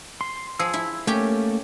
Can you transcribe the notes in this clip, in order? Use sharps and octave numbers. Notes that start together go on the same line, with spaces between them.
C6
F3 G#4 E6
E4
A3 A#3 C#4 G4 G5